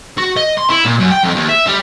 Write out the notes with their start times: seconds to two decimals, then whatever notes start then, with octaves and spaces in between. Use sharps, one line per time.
0.18 F#4
0.37 D#5
0.57 C6
0.70 E4
0.85 A#2
0.99 F#2
1.11 G5
1.23 F2
1.35 D#2
1.49 E5
1.67 G3